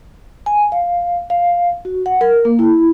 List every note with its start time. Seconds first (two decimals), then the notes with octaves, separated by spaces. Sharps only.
0.46 G#5
0.72 F5
1.30 F5
1.85 F#4
2.06 F#5
2.21 A#4
2.45 A#3
2.59 E4